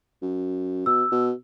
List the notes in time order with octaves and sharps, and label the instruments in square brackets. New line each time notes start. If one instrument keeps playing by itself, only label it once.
[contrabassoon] F#2
[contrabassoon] B2 [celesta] E6
[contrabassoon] B2